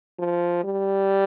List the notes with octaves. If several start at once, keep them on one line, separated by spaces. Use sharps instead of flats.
F3
G3